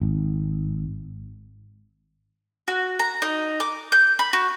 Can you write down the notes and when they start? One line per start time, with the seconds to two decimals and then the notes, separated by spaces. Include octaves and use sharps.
0.02 G#1
2.68 F#4
2.99 A#5
3.22 D#4
3.60 D6
3.92 G6
4.19 B5
4.33 F#4